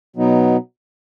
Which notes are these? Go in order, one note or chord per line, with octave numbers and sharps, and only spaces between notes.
B2 F#3 B3 D#4